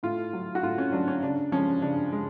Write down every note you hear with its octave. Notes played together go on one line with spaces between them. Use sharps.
A2 F4
F#3
F#4
A2 F4
C#4
F#3 D4
C#4
C#3 D4
F3 G#3 C#4
C#3 D4
G#3